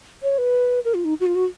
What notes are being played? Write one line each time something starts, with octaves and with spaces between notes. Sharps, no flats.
C#5
B4
A#4
F4
D#4
F#4
F4
F#4